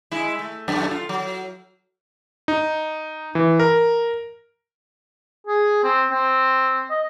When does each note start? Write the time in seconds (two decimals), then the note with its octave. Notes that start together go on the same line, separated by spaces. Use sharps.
0.12 G#3 E4
0.39 A3
0.68 F#2 B2 A3
0.91 F4
1.09 F#3
2.48 D#4
3.35 E3
3.60 A#4
5.47 G#4
5.84 C4
6.11 C4
6.91 D#5